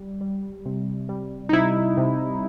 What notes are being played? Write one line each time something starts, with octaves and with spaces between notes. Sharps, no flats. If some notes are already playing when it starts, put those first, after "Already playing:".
Already playing: G3
G3
C3
G3
D#4
C3 E4
C3